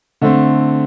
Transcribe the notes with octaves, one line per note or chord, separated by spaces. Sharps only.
D3 A3 C4